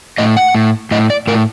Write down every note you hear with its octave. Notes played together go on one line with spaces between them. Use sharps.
A2 D#5
F#5
A2
A2 D#5
D5
A2 A#4